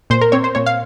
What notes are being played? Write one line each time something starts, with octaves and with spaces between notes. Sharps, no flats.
A#2 C5
A#4
C4 C#5
C5
A#2 C#5
F5